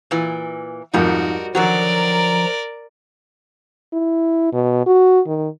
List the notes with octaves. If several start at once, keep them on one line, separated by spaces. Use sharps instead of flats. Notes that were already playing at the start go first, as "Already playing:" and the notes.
A#2 E3
F2 G#2 D#3 G3 D#4 F#4 A#4
D3 D#3 F3 F#3 F#4 A#4 D5 A#5
E4
B2
F#4
D#3